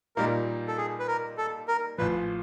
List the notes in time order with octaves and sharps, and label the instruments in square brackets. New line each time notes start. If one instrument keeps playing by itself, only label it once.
[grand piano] A#2 G3 A#3 D#4 [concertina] A#4
[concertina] A4
G#4
B4
A#4
A4
A#4
[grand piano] A1 A2 F3 [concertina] B4